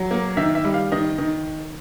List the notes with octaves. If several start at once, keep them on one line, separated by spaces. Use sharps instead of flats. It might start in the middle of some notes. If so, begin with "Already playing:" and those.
Already playing: F#3
A#3
D#3 E5
E5
G3
F5
D#3 D#5
D#3